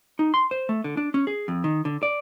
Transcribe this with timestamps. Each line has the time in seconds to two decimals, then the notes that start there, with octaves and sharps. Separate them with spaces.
0.19 D#4
0.34 C6
0.51 C5
0.69 A3
0.84 D3
0.97 D4
1.14 C#4
1.27 G#4
1.48 F2
1.64 D#3
1.85 D3
2.03 D5